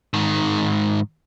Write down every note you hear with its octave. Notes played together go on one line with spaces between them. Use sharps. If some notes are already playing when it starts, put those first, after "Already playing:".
G#2 D#3